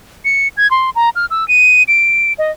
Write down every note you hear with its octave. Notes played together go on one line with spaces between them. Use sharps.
C#7
G#6
C6
A#5
F6
E6
D#7
D7
D#5